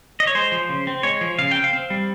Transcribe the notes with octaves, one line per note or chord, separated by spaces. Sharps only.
D#5
C#5
G#3 C5
F3
C#3
C4
G#3 C#5
F3
C#3 F5
C4 G5
F5
C4
G3